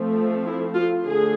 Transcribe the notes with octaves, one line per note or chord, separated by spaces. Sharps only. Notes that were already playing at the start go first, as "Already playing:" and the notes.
Already playing: F3 A3 C4
E4
F4
D3 A3 G#4